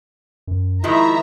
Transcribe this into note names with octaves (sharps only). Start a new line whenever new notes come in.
F#2
D#3 F3 G#3 E4 F4 E5 A#5